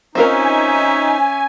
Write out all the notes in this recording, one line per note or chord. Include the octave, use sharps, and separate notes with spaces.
C4 C#4 D#4 F4 A#4 E5 G#5